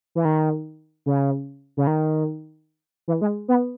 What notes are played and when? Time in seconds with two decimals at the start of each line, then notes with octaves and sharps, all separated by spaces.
0.15 E3
0.25 D#3
1.06 C#3
1.77 C#3
1.87 D#3
3.08 E3
3.21 G#3
3.48 B3